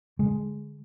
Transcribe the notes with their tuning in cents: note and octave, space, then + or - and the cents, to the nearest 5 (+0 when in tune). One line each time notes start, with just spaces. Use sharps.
D3 -10 G#3 +0